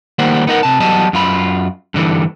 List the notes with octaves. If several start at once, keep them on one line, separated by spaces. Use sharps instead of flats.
D#3 G3 A#3 C5 F#5
B3 D#4 A#4 F#5
C3 A5
E2 F#3 G3 D#5 A5
F#2 F4 B5
G2 D3 E3